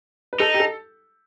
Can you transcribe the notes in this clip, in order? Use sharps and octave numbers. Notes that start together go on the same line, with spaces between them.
B4
D#4 A4
G4
A4